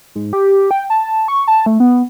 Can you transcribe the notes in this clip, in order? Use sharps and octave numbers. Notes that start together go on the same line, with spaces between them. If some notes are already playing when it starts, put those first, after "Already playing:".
G#2
G4
G5
A5
C#6
A5
A3
B3